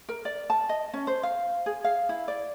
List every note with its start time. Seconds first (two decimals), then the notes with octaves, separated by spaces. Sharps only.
0.09 A#4
0.25 D5
0.50 A5
0.69 D#5
0.94 C#4
1.07 C5
1.23 F5
1.66 G#4
1.84 F5
2.09 E4
2.28 D5